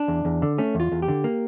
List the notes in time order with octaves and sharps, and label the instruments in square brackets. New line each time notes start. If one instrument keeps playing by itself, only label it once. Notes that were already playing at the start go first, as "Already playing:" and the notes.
Already playing: [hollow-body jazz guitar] D4
E2
E2
D3
A3 C#4
E2 F4
E2
G4
D3
A#3